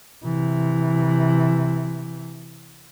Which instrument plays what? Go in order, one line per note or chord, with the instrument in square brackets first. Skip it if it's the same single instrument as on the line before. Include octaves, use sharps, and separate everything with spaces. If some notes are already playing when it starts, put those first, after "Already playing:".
[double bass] C3 E3